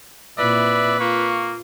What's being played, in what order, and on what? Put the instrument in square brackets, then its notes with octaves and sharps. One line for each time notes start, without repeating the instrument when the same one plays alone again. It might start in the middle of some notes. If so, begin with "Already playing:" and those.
[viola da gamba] A#2 C4 E4 [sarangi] B4 [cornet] D5 [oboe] E5
[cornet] A#3 [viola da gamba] F4 [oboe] C#6